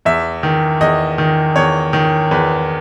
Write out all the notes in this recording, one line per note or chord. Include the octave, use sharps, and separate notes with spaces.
E2 E5
D#3
E2 D#5
D#3
E2 C#5
D#3
E2 B4